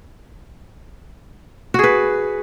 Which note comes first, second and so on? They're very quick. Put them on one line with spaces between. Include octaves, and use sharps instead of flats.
F#4 G#4 B4